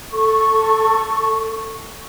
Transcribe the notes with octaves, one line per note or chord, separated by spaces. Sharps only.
A4 C#6